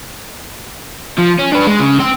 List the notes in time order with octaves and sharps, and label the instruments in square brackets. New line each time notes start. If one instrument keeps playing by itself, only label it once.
[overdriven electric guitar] F3
C#4
D4 B4
G#3
C#3
C4 G5